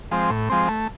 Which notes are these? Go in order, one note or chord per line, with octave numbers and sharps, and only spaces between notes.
F3 G#3 C4
A2
F3 G#3 C4
A3